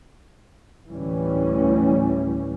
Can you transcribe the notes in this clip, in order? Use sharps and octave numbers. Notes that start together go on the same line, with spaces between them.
D2 A2 E3 G3 C#4